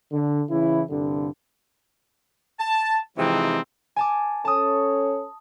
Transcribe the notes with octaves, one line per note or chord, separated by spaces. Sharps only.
D3
C#3 E3 E4
C2 G2 D3
A5
C3 E3 F3 G#3 C4 D#4
G#5 A5 D6
C#4 A4 C#5 A5 D#6